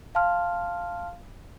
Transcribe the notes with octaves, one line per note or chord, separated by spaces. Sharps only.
F5 A5 C6 F6